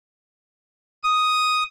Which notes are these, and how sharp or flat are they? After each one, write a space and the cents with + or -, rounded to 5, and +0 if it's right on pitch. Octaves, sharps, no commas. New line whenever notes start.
D#6 +5